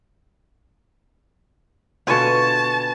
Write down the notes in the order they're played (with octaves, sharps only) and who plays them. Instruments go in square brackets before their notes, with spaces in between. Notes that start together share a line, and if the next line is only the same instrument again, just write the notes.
[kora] B2 D3 F4 [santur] B4 G#5 C#6 [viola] A5